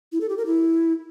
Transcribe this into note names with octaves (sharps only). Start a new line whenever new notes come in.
E4
A4
G4
A#4
E4